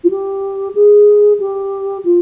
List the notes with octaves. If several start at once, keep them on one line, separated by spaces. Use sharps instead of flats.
F4
G4
G#4
G4
F4